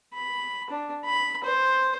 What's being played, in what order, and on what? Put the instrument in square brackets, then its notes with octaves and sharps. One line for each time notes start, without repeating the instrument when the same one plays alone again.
[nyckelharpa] B5
D4
B5
C5